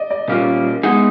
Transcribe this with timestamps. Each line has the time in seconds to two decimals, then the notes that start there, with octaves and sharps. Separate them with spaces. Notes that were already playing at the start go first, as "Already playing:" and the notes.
Already playing: D5 D#5
0.10 D5
0.28 A#2 G3 A#3 C#4 F4 F5
0.83 G#3 B3 D#4 G#4 F#5